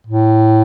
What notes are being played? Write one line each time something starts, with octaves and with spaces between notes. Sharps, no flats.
A2